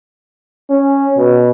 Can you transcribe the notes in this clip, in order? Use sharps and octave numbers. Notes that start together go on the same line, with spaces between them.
C#4
B2